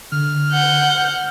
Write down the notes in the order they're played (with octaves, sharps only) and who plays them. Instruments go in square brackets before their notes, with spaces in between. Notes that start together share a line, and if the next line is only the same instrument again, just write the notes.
[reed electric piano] D3 [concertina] F6
[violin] F#5 G6